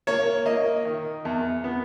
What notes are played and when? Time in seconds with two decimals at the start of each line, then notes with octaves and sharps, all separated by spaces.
0.07 A#3 C#5
0.46 A#3 D#5
0.85 D#3
1.25 E2
1.64 B3